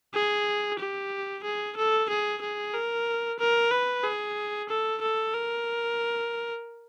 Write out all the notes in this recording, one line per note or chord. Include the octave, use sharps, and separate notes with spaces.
G#4
G4
G#4
A4
G#4
G#4
A#4
A#4
B4
G#4
A4
A4
A#4